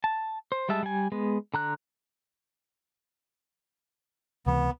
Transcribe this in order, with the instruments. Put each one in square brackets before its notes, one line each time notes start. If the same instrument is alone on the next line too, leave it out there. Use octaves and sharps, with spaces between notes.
[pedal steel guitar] A5
C5
G3 G#3 E5 A5
G3 G#5
G#3 B3
D3 A#5 F#6
[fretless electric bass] C#2 C3 E3 [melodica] B3